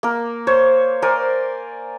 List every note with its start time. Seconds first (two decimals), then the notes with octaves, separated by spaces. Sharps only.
0.03 A#3 A#4
0.47 C5 C#5
1.02 A#4 C5 D5 G#5